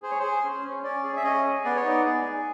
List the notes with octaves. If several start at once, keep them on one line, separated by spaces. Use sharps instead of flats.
G#4 C5
C#5
G#4 C5
C#4
C#4
C#4 D5
G#4
E5
C#4 D#5
G#4
B3 D5
C#5
D#4 D5
G#4
G#4